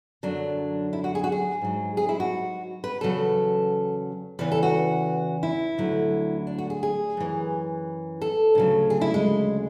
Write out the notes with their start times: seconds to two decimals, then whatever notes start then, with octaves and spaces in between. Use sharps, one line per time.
0.23 F#2 D3 F#3 D4
0.93 E4
1.04 F#4
1.15 G#4
1.24 F#4
1.32 G#4
1.62 G#2 F#3
1.97 G#4
2.09 E4
2.20 F#4
2.84 B4
3.01 E2 C#3 F#3 A4
4.39 E2 C#3 E3 B4
4.52 A4
4.63 F#4
5.43 E4
5.78 D2 D3 F#3
6.47 D4
6.58 F#4
6.70 G#4
6.83 G#4
7.17 F#2 E3
8.22 A4
8.55 D2 C#3 F#3
8.90 G#4
9.01 E4
9.14 G#3